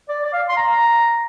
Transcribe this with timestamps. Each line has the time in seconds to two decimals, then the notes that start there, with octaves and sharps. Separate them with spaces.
0.09 D5
0.25 D5
0.33 F5
0.49 C6
0.57 A#5